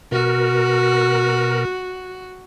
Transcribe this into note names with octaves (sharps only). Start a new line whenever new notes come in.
B2 F#4 A#4